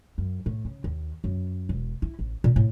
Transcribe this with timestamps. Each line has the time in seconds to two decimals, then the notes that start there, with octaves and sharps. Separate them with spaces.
0.18 F#2
0.46 A2
0.65 C#3
0.84 D#2
1.24 F#2
1.69 E1
2.02 E4
2.19 A1
2.44 A#2
2.56 A2